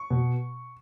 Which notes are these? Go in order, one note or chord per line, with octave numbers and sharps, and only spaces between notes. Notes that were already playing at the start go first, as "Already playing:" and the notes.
Already playing: C#6
B2